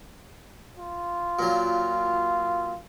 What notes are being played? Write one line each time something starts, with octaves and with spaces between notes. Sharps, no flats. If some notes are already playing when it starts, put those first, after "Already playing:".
F4
A#2 F#3